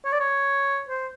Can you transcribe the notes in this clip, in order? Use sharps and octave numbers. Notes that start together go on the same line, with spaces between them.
C#5
D5
C#5
C5